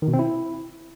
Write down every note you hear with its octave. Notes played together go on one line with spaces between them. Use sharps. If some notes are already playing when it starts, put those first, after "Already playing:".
D#3
B2
C4
E4